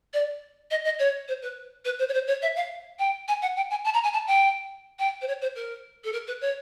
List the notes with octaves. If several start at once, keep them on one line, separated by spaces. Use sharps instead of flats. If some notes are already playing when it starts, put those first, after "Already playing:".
D5
D#5
D#5
C#5
C5
B4
B4
C5
C#5
C5
C#5
E5
F5
G5
G#5
F#5
G5
G#5
A5
A#5
G#5
A5
G5
G5
C5
C#5
C5
A#4
A4
A#4
B4
C#5